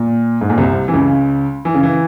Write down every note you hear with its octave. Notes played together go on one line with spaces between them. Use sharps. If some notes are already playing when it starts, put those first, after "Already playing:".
Already playing: A#2
G#2
A#2
C2 C3
E3
C#2 C#3
E3
C#3
E3